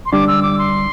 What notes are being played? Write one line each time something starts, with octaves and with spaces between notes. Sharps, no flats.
C6
D3 G3 D4 D6
E6
D6
C6